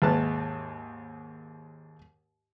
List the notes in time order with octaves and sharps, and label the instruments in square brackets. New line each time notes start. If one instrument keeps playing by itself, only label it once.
[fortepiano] D#2 G#2 E5 A5 F#6